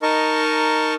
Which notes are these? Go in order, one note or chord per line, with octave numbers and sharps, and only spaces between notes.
D#4 A#4 D#5 A5 C#6